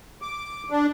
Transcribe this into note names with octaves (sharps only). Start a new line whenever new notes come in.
D6
D4